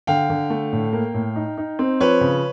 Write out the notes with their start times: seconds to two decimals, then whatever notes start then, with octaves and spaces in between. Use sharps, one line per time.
0.07 D3 F5 G5
0.30 D3
0.50 A3
0.73 A2
0.93 A#3
1.14 A2
1.36 D#4
1.58 D#4
1.79 C4
2.00 F3 B4 C#5
2.21 C#3